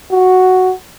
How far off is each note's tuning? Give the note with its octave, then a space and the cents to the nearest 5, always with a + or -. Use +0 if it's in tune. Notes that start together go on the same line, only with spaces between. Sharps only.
F#4 +0